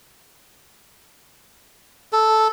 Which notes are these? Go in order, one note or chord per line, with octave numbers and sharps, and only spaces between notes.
A4